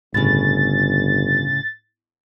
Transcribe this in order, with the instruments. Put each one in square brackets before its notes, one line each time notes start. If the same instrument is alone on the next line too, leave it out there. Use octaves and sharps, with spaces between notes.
[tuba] G1 [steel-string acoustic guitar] A2 C#3 [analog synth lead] A6